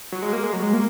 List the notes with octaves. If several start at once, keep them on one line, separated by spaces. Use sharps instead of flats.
F#3
G#3
A#3
G#3
F#3
G#3
A#3